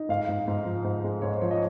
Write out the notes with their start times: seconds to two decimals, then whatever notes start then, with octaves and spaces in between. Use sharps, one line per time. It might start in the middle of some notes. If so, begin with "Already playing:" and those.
Already playing: D#4
0.09 G#2 F5
0.29 G#2
0.48 G#2
0.65 F3
0.84 G#2
1.04 G#3
1.22 G#2 C#5
1.31 C5
1.41 F3 C#5
1.51 D#5